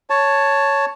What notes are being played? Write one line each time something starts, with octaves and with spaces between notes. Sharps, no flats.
C#5 A5